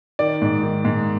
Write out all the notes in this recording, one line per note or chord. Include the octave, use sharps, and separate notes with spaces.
D#3 D5
G#2
D#3
G#2